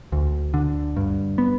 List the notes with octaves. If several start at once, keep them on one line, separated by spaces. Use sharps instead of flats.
D2
D3
G2
B3